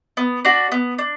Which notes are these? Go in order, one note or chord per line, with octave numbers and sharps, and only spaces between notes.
B3
D4 F#4
B3
D4